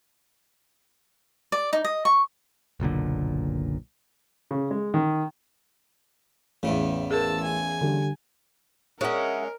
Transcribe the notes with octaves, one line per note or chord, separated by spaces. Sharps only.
D5
D#4
D#5
C#6
F#1 B1 A#2 D3
C#3
G#3
D#3
A1 E2 C#3
G#4 A#4 A5 E6
G#5
D3 G3
G#3 C#4 A#4 C#5 E5 F#5